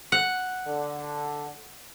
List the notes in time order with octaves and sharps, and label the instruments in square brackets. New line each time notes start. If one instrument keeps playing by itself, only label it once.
[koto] F#5
[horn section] D3